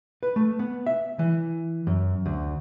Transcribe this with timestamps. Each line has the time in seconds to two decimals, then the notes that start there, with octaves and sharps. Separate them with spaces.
0.23 B4
0.36 A3
0.59 B3
0.86 E5
1.19 E3
1.87 F#2
2.26 D2